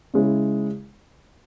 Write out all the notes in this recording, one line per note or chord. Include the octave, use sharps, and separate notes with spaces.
C#3 G#3 C#4 E4